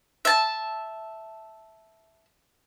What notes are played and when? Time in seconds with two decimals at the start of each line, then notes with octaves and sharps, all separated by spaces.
0.25 E5 A5